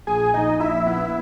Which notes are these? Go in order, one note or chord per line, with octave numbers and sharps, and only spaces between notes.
A#1 G#4 G#5
A#1 D#4 D#5
A#1 E4 E5
B3